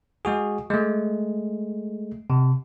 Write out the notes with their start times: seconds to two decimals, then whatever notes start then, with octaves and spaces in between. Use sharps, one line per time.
0.25 G#3 F#4 G#4
0.70 G#3 A3
2.30 C3